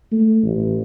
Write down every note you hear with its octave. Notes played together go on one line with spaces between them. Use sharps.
A3
A1